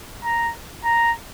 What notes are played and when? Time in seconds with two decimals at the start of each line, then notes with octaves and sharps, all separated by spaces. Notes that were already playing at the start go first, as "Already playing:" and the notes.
0.24 A#5
0.84 A#5